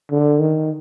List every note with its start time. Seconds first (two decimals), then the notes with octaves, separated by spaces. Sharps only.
0.11 D3
0.40 D#3